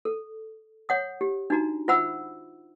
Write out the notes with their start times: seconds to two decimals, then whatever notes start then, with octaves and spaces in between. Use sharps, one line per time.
0.05 A4
0.89 C#5 F#5 D#6
1.21 G4
1.50 D4 D#4 F#4 A#5
1.88 F4 C5 E5 F#5 B5 E6